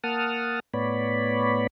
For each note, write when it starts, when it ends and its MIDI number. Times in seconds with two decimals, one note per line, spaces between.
0.04 0.60 58
0.04 0.60 78
0.04 0.60 81
0.04 0.60 87
0.04 0.60 89
0.74 1.67 45
0.74 1.67 59
0.74 1.67 73
0.74 1.67 74
0.74 1.67 83